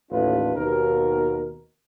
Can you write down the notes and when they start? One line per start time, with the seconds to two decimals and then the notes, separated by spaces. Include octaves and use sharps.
0.11 A1 D#2 A2 D4 F4 B4
0.55 D#2 B2 A#4